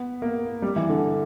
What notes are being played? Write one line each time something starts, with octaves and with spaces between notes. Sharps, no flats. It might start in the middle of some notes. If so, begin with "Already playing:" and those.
Already playing: B3
A#3
G3
E3
D3